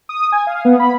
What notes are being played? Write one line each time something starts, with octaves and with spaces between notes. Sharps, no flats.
D#6
G#5
F5
B3
B5